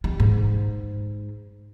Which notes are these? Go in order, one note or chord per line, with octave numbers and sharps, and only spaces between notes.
G3
G#2